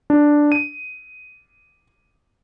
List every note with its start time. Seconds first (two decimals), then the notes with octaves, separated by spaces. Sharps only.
0.10 D4
0.52 D#7